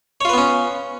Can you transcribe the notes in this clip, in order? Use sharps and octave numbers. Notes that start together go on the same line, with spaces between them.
B3 C#4 F4 B4 C#5